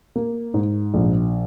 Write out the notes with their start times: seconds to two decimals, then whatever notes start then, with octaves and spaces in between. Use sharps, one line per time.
0.16 A#3
0.54 G#2
0.94 A#1